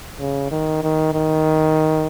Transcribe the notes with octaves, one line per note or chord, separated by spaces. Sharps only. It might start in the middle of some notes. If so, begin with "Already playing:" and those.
C#3
D#3
D#3
D#3